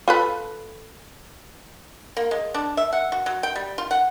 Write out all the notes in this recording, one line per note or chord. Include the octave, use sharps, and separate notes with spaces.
F4 A4 B4
A#3
G#3
D4
E5
F#5
F#4
F#3
G5
G3
F4
F#5